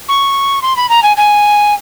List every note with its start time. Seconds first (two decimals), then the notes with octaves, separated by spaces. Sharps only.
0.08 C#6
0.62 C6
0.76 B5
0.89 A#5
1.02 G#5
1.17 G#5